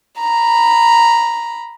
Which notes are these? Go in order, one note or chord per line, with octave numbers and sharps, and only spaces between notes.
A#5 B5